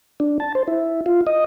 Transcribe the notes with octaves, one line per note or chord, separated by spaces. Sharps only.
D4
A5
C5
E4
F4
D#5